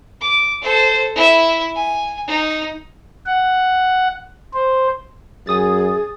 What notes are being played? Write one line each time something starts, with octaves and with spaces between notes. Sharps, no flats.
D6
A4 C5
E4 E5
G#5
D#4
F#5
C5
F#2 G#4 G#5 D#6 A6